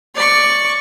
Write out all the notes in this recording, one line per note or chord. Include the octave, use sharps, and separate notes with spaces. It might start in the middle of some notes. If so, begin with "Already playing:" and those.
D5 C#6